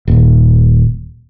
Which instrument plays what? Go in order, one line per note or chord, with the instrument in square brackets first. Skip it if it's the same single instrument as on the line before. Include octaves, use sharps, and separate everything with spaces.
[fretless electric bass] D#1